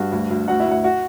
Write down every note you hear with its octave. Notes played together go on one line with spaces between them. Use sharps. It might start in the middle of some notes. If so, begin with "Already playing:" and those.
Already playing: G2 F#4
D2
D2
D2 F#4 F#5
E4 E5
D2
F#4 F#5
F#4 F#5